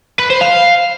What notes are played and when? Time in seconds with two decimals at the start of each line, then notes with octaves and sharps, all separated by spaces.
0.19 B4
0.30 C5
0.41 F5